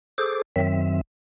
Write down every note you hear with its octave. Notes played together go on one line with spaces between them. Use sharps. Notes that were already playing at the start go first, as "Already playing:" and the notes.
G#4 A4 C5 D6
F#2 D#3 F#3 C4 E5